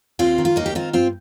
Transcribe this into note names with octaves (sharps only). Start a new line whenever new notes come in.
D#2 C4 F4
D#3
F4
D#2 A#3 D#4
G4
D#3 C4 F4
G2 C4 F4